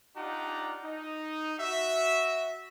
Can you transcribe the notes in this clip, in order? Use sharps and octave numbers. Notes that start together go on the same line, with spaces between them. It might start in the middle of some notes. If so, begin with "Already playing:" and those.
D4 D#4 F4 G4 F#5 A#5
D#4
F#4 E5